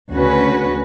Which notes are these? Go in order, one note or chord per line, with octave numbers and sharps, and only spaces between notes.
D2 C#3 C#4 F#4 B4